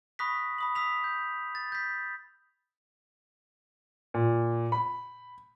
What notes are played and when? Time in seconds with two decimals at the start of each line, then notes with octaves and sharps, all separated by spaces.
0.19 B5 C#6 D#6 F#6 A#6 B6
0.58 B5 D#6 F#7
0.75 D#6 E6 B6 F7
1.04 G6
1.55 A6
1.72 G6 B6
4.14 A#2
4.72 B5